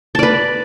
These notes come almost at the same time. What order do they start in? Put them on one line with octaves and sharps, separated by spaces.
A5 D5 B4